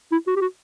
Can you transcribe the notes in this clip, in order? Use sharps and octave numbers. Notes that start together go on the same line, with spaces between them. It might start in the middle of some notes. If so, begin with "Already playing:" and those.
E4
F#4
G4
F#4